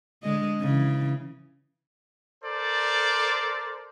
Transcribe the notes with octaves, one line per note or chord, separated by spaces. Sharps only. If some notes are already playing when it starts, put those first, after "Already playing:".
D3 G#3 D#5
C#3 E3
A4 A#4 C5 D5